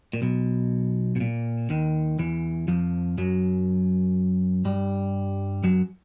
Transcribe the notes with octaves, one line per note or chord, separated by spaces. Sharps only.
A#2
B1 B2
B2
A#2
D#2 D#3
E2 E3
F2 F3
F#2 F#3
G2 G3
F#2 F#3